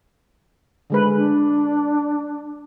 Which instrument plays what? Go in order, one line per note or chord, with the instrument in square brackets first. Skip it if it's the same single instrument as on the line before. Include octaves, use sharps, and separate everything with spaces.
[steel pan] D3 G#3 B4
[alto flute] D4